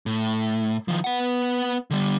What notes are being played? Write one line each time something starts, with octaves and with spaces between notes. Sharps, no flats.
A2
D#3 F3
B3 F#5
D3 G3